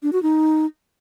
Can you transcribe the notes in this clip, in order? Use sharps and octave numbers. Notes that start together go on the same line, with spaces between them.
D4
F#4
D#4